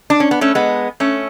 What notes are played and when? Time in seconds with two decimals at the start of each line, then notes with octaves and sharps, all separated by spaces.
0.10 D4
0.20 C#4
0.31 B3
0.41 A3 C#4
0.55 G#3 B3
1.00 A3 C#4